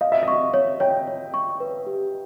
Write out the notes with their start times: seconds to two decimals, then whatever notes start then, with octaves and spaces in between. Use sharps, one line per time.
0.01 D#5 F5
0.12 E5
0.23 D#5 C#6
0.54 C#5
0.80 C#5 G5
1.07 C#5
1.34 C#6
1.60 B4
1.87 G4